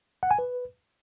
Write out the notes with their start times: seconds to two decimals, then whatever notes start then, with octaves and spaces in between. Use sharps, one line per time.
0.23 F#5
0.31 G#5
0.39 B4